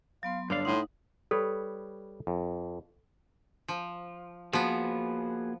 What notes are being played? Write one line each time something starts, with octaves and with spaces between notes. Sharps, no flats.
F#3 B3 F5 C6
G2 D3 D4 C#5 D5 F5
A2 D#4 F#5 C6
G3 A4 B4 C#5
F2
F3
F3 A#3 B3 F#4 G#4